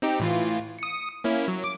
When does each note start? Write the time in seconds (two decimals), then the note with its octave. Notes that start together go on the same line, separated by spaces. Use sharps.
0.02 C4 D#4 G4
0.20 A2 E3 F4
0.79 D#6 C#7
1.24 A#3 C#4 E4
1.48 F#3
1.64 D6